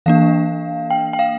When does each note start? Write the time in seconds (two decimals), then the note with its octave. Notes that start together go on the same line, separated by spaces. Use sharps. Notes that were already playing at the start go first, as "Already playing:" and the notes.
0.06 E3 A#3 D4 F5
0.90 G5
1.13 G5
1.19 F5